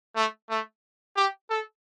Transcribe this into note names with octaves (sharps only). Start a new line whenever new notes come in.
A3
A3
G4
A4